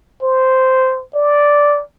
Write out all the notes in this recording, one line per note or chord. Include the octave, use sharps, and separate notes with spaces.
C5
D5